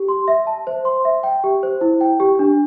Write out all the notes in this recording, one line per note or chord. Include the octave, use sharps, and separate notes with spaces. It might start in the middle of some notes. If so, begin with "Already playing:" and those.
Already playing: G4
C6
E5
A5
C5
C6
E5
G5
G4
C5
E4
G5
G4
D4